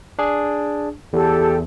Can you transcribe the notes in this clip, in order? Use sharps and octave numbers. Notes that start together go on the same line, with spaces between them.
D4 G#4
E2 G4 A4